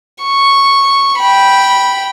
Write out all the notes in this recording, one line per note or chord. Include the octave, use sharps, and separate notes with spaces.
C#6
G5 B5